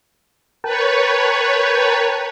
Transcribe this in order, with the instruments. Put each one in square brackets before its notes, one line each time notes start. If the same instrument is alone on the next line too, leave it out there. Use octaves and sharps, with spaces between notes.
[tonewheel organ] A#4 G5 A5 [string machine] B4 C#5